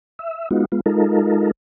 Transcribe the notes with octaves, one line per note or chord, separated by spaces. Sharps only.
E5
G#3 B3 D#4 F4 F#4
G#3 B3 F4
G#3 D#4 F4 A4 A#4